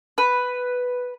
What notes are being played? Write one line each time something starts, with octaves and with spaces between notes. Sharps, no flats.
B4